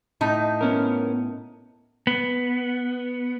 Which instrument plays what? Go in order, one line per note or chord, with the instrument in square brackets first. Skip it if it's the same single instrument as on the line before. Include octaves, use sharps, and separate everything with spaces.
[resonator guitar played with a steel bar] A2 D#4
[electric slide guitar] B3 C#4 A#4
B3